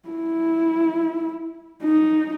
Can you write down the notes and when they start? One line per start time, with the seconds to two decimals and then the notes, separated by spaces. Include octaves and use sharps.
0.09 E4
1.84 D#4